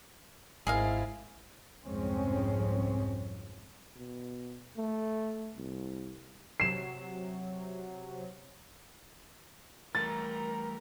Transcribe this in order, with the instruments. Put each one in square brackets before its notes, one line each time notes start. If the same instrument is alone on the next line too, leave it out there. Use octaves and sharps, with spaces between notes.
[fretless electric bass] G#1 [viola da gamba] G#2 E4 [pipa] G#4 A#4 F5
[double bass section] C2 F2 G#2 G#3 C4 C#4
[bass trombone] B2
A3
C2
[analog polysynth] C3 F#3 [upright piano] C7 E7
[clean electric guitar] E3 G3 A3 [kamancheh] A#4 A#5 [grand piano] A6